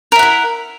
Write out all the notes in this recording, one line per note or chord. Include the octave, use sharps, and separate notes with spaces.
E4 A#4 E5 F#5